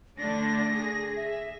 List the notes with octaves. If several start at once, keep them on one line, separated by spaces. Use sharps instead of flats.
D3 A3 D4 A#6
G#4
E5